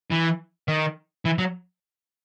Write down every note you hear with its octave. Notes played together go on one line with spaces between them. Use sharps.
E3
D#3
E3
F#3